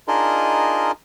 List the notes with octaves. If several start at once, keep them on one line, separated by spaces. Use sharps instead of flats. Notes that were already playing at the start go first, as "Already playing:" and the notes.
D4 D#4 F4 G#4 A#4 D#5